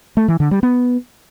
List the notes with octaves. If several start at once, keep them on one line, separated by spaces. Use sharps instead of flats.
A3
E3
D3
G3
B3